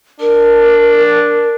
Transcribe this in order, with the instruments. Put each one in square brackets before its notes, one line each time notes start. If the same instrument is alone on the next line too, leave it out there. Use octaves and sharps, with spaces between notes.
[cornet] D4 [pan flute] A#4